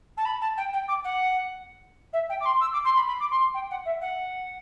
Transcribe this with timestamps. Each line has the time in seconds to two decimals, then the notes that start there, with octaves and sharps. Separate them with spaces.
0.17 A5
0.25 B5
0.41 A5
0.57 G5
0.72 G5
0.88 D6
1.04 F#5
2.13 E5
2.29 G5
2.40 D6
2.45 C6
2.60 E6
2.72 D6
2.84 C6
2.95 B5
3.07 B5
3.20 D6
3.30 C6
3.54 G5
3.70 F#5
3.85 E5
4.01 F#5